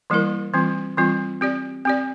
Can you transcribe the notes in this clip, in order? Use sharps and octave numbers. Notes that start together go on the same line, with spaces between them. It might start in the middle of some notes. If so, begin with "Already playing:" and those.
E3 G3 A#3 E4 A#4
E3 G3 C4 F4
E3 G3 C4 F4
C4 G4 D5
C4 G4 D5